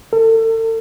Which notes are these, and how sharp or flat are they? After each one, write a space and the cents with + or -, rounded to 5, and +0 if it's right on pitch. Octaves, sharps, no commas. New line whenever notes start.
A4 +40